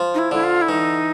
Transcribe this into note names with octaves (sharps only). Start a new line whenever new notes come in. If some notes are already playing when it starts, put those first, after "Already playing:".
Already playing: F3
D#4
E4
D3 E4
F4
E4
E3 D#4